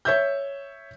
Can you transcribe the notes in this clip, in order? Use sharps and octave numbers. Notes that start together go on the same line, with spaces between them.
C#5 E5 G6